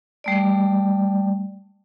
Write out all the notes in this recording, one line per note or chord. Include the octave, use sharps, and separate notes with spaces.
G3 A3 D5